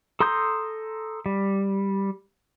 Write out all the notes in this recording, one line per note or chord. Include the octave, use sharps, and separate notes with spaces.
A4 A#5 C6 D#6 G6
G3